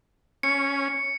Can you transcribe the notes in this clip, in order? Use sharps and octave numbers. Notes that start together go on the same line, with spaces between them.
C#4 C#7